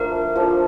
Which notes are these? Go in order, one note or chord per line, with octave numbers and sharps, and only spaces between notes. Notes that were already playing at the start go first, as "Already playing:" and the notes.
Already playing: F3 A3 D4 A4 A#4
F3 A3 D4 A4